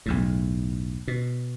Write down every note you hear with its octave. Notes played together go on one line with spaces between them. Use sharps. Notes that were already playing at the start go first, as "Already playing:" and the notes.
B1 E2 A2
B2